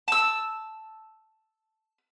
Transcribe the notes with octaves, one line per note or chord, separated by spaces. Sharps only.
A5 E6